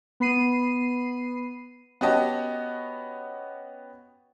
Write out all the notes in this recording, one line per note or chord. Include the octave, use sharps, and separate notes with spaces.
B3 B5 C7 D#7
B3 C#4 F#4 G4 D#5 A5